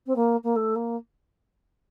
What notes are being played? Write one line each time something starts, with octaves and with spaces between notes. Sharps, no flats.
C4
A#3
A#3
A3
A#3